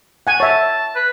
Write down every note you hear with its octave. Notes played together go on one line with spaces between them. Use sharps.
F#5 G#5
C#5 E5 A5
B4